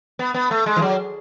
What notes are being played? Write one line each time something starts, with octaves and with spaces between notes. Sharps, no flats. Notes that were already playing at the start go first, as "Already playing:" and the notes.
B3
B3
A3
G#3
E3
F#3